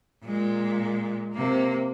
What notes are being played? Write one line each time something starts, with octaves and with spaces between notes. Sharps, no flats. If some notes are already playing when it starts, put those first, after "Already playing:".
A#2 G#3
C3 A#3